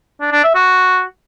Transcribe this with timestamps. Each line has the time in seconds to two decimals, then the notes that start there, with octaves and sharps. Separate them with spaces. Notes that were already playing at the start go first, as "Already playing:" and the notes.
0.21 D4
0.32 D4
0.43 E5
0.55 F#4